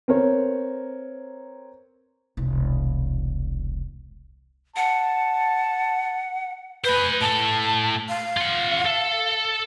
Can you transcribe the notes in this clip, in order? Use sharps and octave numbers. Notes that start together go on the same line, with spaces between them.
C4 A#4 B4 C#5
E1 C2
F#5 A5
B4 C5 G#5
A2 A4 A5
F5
F4 F#5
A4